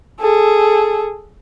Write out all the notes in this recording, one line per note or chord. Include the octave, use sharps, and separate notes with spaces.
G#4 A4